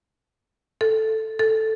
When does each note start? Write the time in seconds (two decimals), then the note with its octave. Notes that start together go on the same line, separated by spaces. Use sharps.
0.81 A4
1.39 A4